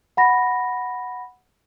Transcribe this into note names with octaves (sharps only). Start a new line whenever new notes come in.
F#5 B5 A#6